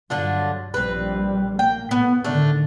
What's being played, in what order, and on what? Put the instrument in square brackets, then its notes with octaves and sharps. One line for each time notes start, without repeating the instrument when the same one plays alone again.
[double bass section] G2 F#3 [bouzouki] D3 D4 F4
[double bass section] A#1 G3 [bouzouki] C4 B4
[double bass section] A#3 [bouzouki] G5
[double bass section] A2 [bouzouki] B3
[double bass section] A2 D3 D#3 [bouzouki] A3 D4